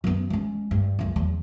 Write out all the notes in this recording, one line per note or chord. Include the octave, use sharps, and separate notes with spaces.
F#2 B3
G#3 C#4
G2
C#2 F#2
E2 F#3